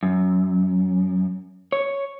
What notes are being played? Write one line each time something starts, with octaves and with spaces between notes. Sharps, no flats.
F#2
C#5